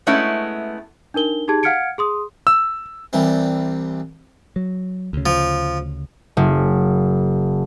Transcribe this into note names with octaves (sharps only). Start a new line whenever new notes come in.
G#3 A3 B3 C#4 E4
D4 D#4 A#4 G7
D#4 G4 G#4 A5 G#6
F5 F#5 F6 G#6 C#7 D7
G#4 C6 D#6
E6
C2 E3 G3 C4
F#3
D2 C#3
F3
F#1